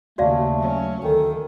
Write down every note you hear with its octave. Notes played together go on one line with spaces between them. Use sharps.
D#2 C#3 A3 F#4 D5 F5
F#3 C#4
D2 D#3 A4